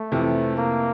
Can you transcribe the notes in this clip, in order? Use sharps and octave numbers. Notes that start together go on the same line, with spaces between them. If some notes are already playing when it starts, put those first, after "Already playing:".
Already playing: A3
F2 C3 E3
A#3